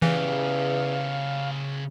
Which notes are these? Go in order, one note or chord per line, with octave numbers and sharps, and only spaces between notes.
E2 C#3 E3 G4 F5